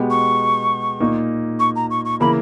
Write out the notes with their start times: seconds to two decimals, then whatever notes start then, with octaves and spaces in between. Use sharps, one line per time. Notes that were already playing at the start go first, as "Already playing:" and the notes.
Already playing: B2 G#3 B3 G4
0.10 C#6
1.00 A#2 A#3 D#4
1.59 C#6
1.76 A#5
1.90 C#6
2.05 C#6
2.20 C#3 E3 A#3 E4 A#4 B5